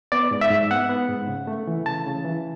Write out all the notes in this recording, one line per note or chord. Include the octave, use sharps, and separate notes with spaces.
B3 D5
G#2
E5
G#2
B3 F#5
B3
G#2
C#3
A3
E3
C#3 A5
C#3
E3